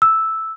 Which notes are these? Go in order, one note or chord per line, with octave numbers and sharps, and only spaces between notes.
E6